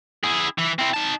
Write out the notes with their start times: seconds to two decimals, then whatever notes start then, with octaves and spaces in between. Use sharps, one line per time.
0.24 E4 G#4
0.58 E3
0.79 C4 E4
0.94 D#4 A5